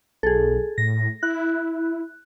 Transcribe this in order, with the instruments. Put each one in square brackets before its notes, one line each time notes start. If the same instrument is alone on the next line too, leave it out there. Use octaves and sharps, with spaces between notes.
[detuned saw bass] B1 [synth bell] G#4 A4
[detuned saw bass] A2 [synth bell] A#6
[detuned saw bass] E4 [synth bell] F#6